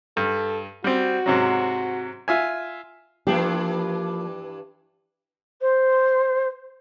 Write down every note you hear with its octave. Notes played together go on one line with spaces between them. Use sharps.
G2 A4
G3 C4 F#4
G#2 C3 F#3
F4 E5 G#5
G2 E3 F3 A#3 D4 G4
C5